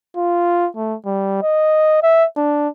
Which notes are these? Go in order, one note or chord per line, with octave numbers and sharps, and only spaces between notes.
F4
A3
G3
D#5
E5
D4